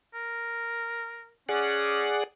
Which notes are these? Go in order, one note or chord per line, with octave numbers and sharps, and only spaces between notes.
A#4
C#4 G#4 D5 F#5